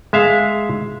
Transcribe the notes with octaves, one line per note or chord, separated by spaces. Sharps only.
G#3 E5 F5